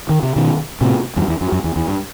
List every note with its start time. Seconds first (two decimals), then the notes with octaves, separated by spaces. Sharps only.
0.09 D#3
0.23 C3
0.36 B2 D#3
0.81 A2 C3
1.16 E2 G2
1.28 E2
1.41 F#2
1.52 F#2
1.64 E2
1.76 E2
1.88 G2